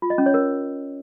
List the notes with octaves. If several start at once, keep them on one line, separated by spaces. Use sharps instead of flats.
F4
D#5
C#4
C#5
A#4